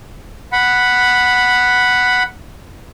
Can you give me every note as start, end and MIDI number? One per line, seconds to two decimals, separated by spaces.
0.52 2.23 78
0.52 2.23 83